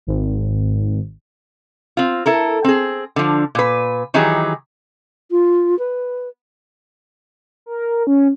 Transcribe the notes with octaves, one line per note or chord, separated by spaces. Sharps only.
G#1
C4 F4
E4 A4 A#4
C4 G#4
D3 F3
A#2 B4
D#3 E3 F#3 D#4 G4 G#4
F4
B4
A#4
C#4